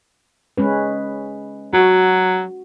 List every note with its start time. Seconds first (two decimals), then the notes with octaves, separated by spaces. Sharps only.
0.58 G#3 C#4 B4
1.73 F#3 F#4